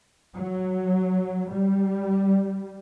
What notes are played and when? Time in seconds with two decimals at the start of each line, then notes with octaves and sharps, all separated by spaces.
0.36 F#3
1.52 G3